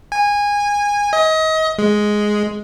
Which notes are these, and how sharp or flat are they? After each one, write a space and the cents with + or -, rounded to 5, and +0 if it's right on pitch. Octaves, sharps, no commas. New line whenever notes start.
G#5 -20
D#5 +30
G#3 +5